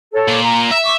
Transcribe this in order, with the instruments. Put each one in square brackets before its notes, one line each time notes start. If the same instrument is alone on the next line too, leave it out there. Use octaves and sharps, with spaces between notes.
[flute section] A4 C#5
[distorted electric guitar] A#2
[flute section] A#5
[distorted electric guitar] E5
[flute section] C#6 D6